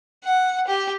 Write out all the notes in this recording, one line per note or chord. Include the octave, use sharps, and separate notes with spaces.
F#5
G4